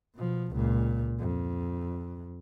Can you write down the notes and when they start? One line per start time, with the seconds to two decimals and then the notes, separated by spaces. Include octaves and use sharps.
0.16 B2 F3
0.52 C#2 A#2
1.20 F2